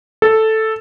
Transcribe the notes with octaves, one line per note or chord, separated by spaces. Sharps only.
A4